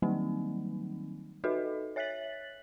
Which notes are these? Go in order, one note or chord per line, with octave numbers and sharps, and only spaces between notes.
D#3 F#3 G3 A#3 C4 D#4
D#4 F#4 A4 B4 D#5 E5
C#5 E5 F#6 A6 B6 F#7